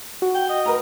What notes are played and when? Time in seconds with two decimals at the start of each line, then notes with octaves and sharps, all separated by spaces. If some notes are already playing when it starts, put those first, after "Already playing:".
0.22 F#4
0.35 G5
0.49 D#5
0.66 A#4 B4 A#5